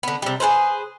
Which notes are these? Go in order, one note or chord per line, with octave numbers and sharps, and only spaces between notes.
D3 B3
C3 G3
G#4 A4 B4 C5